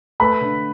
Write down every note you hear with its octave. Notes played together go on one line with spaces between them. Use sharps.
A3 B4 B5
D3